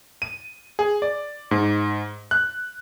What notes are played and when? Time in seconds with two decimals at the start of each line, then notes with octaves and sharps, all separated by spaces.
0.22 D#7
0.79 G#4
1.02 D5
1.51 G#2
2.31 F#6